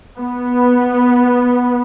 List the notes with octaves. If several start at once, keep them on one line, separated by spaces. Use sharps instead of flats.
B3